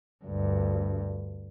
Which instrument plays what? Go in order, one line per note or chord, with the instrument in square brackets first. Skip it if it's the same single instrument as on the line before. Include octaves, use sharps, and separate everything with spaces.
[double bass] D2 G2